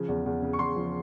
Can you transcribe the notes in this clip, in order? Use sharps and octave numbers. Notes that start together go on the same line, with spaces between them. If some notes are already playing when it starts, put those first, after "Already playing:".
Already playing: C#3 F3
E2
E2
C#3
C#6
E2 C6
F3